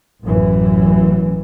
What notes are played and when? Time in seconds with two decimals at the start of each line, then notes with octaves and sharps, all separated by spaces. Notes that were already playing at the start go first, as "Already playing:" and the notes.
0.23 A1 F#2 E3